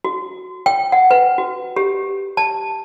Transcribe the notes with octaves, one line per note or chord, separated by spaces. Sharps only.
F#4
G5
F#5
B4
F#4
G4
A5